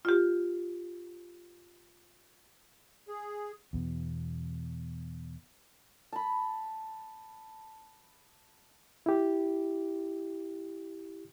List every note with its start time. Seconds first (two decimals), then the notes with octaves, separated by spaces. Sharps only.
0.05 F4 G4
3.08 G#4
3.73 E2 B2
6.13 A5 B5
9.06 E4 G4